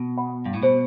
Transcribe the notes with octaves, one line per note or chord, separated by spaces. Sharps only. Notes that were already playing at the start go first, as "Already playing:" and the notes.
Already playing: B2
F#5 B5
G2
A2
B2 C5